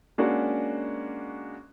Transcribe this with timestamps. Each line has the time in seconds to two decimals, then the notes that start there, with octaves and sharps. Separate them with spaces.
0.18 G#3 A#3 C#4 D4 F#4